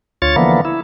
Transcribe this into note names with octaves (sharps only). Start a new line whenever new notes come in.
D2 F4 C#5 A6
D3 E3 F3 A#3 B3
E4